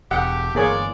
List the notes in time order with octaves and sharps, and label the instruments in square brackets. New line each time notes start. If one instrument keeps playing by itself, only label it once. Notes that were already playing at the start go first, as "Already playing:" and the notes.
[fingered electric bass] E1 [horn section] A3 G4 [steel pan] F#5
[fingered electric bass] G1 E3 [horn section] G#3 D5 [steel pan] A#3 G#4 C#5